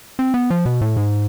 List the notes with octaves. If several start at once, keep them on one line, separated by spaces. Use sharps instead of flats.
C4
B3
F3
B2
A2
G#2